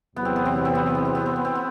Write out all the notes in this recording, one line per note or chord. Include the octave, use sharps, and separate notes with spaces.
E2 C3 F#3 B3
C4
B3
C4
B3
C4
B3
C4
B3
C4
B3
C4
B3
C4
B3